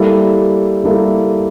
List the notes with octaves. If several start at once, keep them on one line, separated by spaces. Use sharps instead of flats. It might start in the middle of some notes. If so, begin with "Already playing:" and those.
Already playing: G3 A#3 E4 A4
G3 A#3 E4 A4